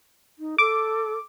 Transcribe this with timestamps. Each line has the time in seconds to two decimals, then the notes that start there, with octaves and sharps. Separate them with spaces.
0.38 D#4
0.58 A4 D6